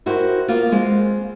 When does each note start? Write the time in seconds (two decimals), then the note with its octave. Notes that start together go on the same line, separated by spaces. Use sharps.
0.06 E4 F#4 G4 A#4 C5
0.48 A#3 B3 F4
0.72 G#3 C4